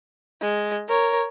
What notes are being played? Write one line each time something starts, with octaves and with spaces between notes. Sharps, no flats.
G#3
A#4 C#5